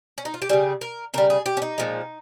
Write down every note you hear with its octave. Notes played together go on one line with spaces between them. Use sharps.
C#4
D#4
F4
G4
C#3 G3 G#4
A#4
C#3 G3 A#4
G#4
G4
C#4
D#4
A#2 F3 G#3